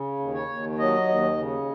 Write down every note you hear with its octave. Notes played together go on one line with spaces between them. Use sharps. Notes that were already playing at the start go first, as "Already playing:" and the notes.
Already playing: C#3
D#2
C#5
D#2
F#3 D#5
D#2
C#3